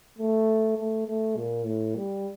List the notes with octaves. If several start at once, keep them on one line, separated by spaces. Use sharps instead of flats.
A3
A3
A3
A#2
A2
G3